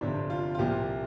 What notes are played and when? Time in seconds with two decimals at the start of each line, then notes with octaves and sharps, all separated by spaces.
0.01 G1 F2 C3 D4
0.30 F4
0.55 F4
0.58 C2 A#2 F3 G4